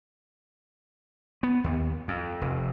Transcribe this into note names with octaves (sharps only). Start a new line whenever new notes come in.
B3
D#2
F2
F1